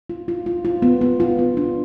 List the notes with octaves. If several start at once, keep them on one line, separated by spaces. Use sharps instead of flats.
F4
F4
F4
F4
B3
B3
F4
B3
D4